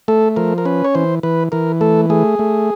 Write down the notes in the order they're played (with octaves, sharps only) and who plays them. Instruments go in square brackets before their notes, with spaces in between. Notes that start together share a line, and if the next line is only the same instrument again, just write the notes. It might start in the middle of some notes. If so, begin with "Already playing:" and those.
[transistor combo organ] A3 A4
F3 A#4
A#4
C#4 B4
C#5
E3 C5
E3 B4
E3 A#4
A3 A4
A3 G#4
A3